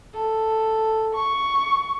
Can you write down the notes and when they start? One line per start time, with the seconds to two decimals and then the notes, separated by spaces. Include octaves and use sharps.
0.14 A4
1.15 C#6